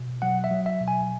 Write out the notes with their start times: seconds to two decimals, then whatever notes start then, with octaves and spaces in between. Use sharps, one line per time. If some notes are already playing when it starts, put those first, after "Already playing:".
Already playing: B2
0.22 F#3 F#5
0.44 E5
0.51 F#3
0.66 E5
0.81 B2
0.88 G#5